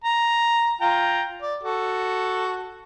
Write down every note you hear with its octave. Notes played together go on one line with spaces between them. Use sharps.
A#5
F4 G5 A#5
D5
F#4 A4